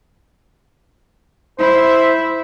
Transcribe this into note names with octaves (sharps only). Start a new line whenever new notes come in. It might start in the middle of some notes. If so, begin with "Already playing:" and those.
E4 C5 E5